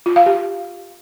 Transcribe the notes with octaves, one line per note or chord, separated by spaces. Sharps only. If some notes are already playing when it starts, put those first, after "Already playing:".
F4
F5
G4